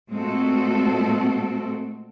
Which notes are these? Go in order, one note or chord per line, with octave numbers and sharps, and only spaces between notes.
A#2 G#3 A3 C4 F#4 A4